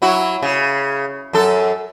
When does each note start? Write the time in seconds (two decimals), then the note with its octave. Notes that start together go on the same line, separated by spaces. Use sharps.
0.02 F#3 E4 F#4
0.42 C#3
1.33 F#2 A4